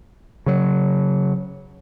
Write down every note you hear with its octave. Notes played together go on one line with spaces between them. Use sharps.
C#3 F#3